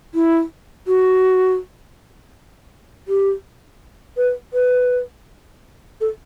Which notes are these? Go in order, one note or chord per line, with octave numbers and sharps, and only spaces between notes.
E4
F#4
G4
B4
B4
A4